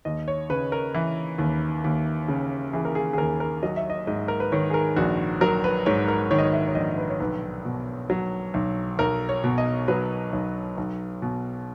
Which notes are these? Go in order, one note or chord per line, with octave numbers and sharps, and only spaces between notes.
D#2 D#5
C#5
C#3 B4
A#4
E3
D#2
D#2
C#3
E3 G#4
A#4
G#4
G#4
D#2 A#4
A#4
F#3 D#5
E5
D#5
G#2 D#5
A#4
B4
D#3 C#5
G#4
A#4
A#1 F#4
F#3 A#4
B4
G#2 C#5
A#4
D#3 C#5
D#5
C#5
E5
C#5
A#1 D#5
B4
C#5
B1 B4
B2
F#3
B1
B1 A#4
C#5
B2
D#5
F#3 B4
B1
B1
B2